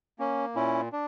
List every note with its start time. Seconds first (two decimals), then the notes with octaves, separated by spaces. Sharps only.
0.19 A#3 C#4
0.55 A#2 C#4 E4
0.93 D4